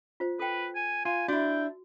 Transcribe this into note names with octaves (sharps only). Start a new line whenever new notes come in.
F4 C5
A4 B4 G5
G#5
F4 G#5
D4 E4 F#4 G5